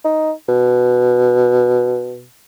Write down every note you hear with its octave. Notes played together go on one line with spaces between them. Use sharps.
D#4
B2